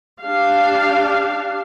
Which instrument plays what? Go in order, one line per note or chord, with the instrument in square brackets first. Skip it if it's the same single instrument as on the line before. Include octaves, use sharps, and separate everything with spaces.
[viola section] D4 G4 F5